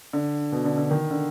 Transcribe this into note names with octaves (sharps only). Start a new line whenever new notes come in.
D3
B2
D3
D3
D#3
D3